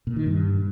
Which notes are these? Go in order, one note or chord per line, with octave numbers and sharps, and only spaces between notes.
A#2
D#3
G2